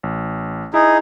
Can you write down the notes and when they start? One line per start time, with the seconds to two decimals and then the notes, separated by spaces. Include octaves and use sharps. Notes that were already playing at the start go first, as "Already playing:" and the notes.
0.03 A1
0.74 D#4 E4 G#4